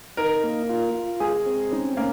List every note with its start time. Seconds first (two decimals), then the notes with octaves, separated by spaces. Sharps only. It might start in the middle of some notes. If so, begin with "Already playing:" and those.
0.17 D#4 A#4
0.44 A#3
0.69 F4
0.95 F4
1.20 G#3 G#4
1.46 C4
1.72 C#4 D#4
1.97 A#3 C#4